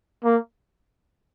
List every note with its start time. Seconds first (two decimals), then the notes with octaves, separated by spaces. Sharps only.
0.24 A#3